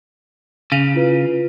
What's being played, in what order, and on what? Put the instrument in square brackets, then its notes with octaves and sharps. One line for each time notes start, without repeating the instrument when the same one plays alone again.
[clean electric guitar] C#3 [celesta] F5 D#7 F7
[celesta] E4 F4 B4